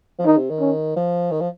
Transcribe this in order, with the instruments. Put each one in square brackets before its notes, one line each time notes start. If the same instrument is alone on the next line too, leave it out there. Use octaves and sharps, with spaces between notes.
[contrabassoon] F3
[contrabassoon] D#3 [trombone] D#4
[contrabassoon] C3
D#3
[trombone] C#4
[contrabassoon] F3
D#3
F3